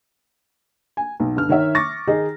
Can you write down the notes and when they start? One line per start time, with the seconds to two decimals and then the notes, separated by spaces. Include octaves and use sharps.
0.97 G#5
1.20 B1
1.36 G1 F6
1.49 D#3 C#5 E5
1.75 C#6 D6 A6 A#6
2.07 D#3 D#4 G#4 D#5